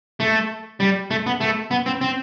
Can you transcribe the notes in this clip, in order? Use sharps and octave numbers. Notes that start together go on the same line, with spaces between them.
A3
G3
A3
B3
A3
B3
C4
C4